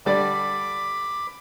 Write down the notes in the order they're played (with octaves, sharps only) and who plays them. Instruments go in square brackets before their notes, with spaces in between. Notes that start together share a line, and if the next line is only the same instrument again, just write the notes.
[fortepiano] D3 G3 D5 [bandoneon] B5 D6